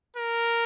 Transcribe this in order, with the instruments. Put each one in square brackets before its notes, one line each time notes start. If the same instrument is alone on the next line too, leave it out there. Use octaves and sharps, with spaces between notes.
[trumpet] A#4